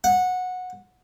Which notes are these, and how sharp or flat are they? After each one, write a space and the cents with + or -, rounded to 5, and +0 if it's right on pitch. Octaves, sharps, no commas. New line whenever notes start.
F#5 -15